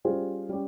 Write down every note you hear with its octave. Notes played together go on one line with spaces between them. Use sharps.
G3 C#4 F4 G#4 C5
G3 C#4 G4